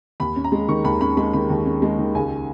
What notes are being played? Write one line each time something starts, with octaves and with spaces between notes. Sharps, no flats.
D#2 B5
C#4
A#5
G#3
D#3 C#6
D#2 B5
C#4 B5
G#3 B5
D#3 B5
D#2
C#4
G#3
D#3
C#2 G#5